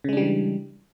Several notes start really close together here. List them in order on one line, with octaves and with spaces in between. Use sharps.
C#3 G#3 D4 G3 E3